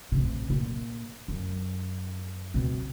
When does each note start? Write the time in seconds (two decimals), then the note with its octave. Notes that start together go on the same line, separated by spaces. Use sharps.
0.12 A1 C3
0.50 A#2
1.28 F#2
2.54 B2 C4